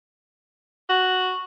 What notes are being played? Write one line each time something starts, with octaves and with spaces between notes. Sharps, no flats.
F#4